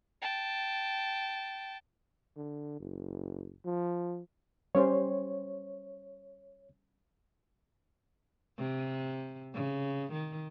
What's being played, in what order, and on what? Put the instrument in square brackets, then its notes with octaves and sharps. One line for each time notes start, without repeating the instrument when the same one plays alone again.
[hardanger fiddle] G5 A5
[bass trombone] D3
F#1
F3
[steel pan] G3 C#4 C5 [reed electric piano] C#5
[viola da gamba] C3
C#3
D#3